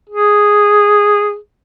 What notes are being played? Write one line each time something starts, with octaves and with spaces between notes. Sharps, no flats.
G#4